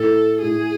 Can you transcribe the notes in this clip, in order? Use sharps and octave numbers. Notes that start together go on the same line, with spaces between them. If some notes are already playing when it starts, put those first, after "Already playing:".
Already playing: A2 A4
A2 G#4